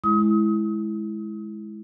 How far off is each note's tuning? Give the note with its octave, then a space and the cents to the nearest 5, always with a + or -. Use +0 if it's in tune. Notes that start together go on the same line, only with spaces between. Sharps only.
G#3 +15 E4 +0 D#6 +35